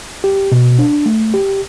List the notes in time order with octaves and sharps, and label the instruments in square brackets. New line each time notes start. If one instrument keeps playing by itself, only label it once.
[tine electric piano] G4
B2
D4
A3
G4